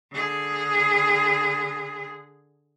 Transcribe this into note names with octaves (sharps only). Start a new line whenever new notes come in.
D3 G#4